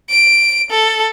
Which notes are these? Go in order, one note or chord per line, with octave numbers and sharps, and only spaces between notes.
D7
A4